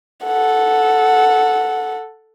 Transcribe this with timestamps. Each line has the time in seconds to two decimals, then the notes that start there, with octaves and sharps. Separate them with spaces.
0.24 A4 F#5